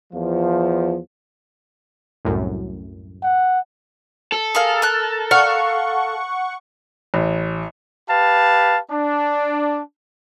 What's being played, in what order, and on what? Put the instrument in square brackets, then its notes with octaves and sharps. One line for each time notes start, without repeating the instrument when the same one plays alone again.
[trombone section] E2 F3
[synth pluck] C2 F#2 A2
[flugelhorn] F#5
[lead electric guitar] A4
[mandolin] G#4 A#4 F5
A#4 F#6
[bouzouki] F5 [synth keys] F#5 C#6
[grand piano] A1
[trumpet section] G4 B4 F5 A5
D4